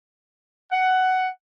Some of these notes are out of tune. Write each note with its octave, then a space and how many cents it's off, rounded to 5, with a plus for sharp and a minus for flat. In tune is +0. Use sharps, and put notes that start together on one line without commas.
F#5 +10